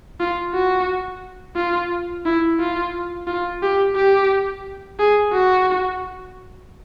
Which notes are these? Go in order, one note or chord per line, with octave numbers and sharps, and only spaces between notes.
F4
F#4
F4
E4
F4
F4
G4
G4
G#4
F#4